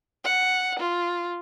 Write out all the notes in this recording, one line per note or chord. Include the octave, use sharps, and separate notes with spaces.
F#5
F4